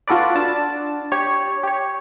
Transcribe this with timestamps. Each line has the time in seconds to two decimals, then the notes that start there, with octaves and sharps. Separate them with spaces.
0.08 F4 F#4 A4 B4 D5
0.35 D4 A5
1.12 G4 C#5 C#6
1.63 G4 C#5